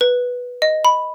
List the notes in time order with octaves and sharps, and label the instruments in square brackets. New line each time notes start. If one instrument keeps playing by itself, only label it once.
[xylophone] B4
D#5
B5